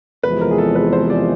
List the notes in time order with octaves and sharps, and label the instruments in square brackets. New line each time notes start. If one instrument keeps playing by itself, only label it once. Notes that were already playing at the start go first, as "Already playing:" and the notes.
[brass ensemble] E2 C3 F3 G#3 [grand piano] B4
[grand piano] A#4
G#4
A4
B4
C5
D5